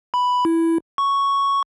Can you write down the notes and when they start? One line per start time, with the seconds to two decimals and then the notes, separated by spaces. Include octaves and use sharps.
0.14 B5
0.45 E4
0.98 C#6